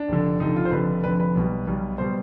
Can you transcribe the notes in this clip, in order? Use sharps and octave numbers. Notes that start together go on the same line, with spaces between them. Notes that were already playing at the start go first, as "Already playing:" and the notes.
Already playing: D4
F1 F2 D3
F1 F2 D3 D#4
F4
C5
F1 F2 D3 B4
F1 F2 D3 B4
B4
B1 B2 G3
B1 B2 G3
B2 G3 C5